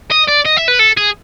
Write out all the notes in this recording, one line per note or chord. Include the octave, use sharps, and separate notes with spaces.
D#5
D5
D#5
E5
B4
A4
G#4